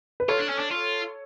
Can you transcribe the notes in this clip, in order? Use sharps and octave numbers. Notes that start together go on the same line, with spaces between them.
B4
F4 A4 C#5
D4
C#4
D4
F4